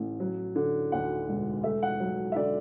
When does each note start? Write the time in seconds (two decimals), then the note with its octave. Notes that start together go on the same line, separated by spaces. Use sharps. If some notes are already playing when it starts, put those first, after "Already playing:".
Already playing: A1 A2
0.20 F#3
0.56 D3
0.92 D2 F#5
1.29 E1
1.64 A3 E5
1.83 F#5
2.00 F#3
2.32 E5
2.36 D3 D5